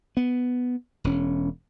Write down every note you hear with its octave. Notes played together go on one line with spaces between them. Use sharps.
B3
E1 C#4